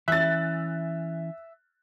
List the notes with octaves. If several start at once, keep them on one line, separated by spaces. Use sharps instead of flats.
E3 C#4 E5 F#6 A6